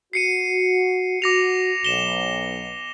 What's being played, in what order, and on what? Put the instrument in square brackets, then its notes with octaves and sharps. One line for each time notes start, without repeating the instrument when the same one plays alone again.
[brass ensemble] F#4 [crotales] C7 C#7 D#7
[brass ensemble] F#4 [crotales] D6 A#6 F7
[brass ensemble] B1 [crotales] E7 G7